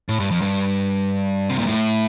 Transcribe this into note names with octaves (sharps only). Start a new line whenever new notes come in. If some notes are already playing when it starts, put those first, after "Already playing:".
A2
G2
F2
G2
C3
A#2
A2